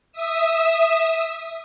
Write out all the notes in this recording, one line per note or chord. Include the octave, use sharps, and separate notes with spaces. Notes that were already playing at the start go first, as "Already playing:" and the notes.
E5 D#6 E6